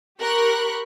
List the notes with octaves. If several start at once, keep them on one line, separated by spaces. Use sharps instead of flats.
G4 A#4 B5 C#6 F#6